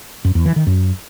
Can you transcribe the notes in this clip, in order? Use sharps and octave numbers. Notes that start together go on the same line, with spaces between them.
F#2
E2
E3
D#3
F#2